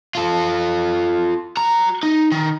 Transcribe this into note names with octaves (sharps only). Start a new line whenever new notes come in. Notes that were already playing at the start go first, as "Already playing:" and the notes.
F4 A4
F#4 A#5
D#4
D#3